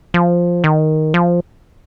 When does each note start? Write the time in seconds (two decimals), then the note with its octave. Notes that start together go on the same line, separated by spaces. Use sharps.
0.14 F3
0.64 D#3
1.14 F3